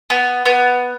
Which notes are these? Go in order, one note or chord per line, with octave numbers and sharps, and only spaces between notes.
B3
B3